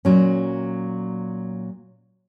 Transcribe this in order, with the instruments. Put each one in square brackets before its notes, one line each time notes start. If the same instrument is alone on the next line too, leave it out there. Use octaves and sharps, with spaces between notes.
[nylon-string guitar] A#2 F#3 C#4